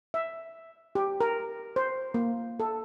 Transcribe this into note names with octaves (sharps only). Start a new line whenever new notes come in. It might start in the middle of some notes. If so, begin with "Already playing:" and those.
E5
G4
A#4
C5
A#3
A4